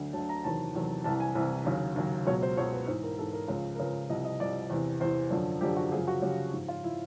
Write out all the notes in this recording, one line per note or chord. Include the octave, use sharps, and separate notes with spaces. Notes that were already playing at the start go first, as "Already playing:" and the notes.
Already playing: D2 D3 F#3
D2 D3 F#3 A5
A#5
E2 C3 D#3 F#3 A5
E2 C3 D#3 F#3
C2 C3 E3 A5
G#5
C2 C3 E3
D#2 C#3 F#3
D#2 C#3 F#3
C#2 B2 F#3 C#5
C5
C#2 B2 F#3 C#5
B4
G#2 E3 C5
A#4
G#2 E3 A4
A#4
C#2 C#3 F3
A#4
C#2 C#3 F3 B4
C2 C3 F3 D#5
D#5
C2 C3 F3 D5
E2 C3 E3
E2 C3 E3 C5
F#2 D3 F3
F#2 D3 F3 G4
F#4
F#2 C#3 F3 G#4
F#4
F#2 C#3 F3 G4
G#2 F3
F4
F3 E4